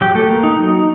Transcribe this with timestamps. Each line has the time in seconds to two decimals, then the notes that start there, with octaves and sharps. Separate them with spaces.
0.01 F#3 G4 G5
0.15 A3 A4
0.29 A#3
0.43 D#4
0.56 F#3